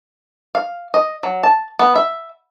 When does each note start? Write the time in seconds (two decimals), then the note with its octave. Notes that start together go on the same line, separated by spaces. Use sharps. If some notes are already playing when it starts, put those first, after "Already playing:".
0.55 F5
0.94 D#5
1.23 F#3
1.43 A5
1.79 B3
1.96 E5